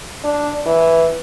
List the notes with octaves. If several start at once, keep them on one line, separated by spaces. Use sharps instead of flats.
D4
E3